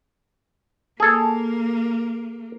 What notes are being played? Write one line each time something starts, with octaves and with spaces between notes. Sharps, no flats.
A#3 G#4 A4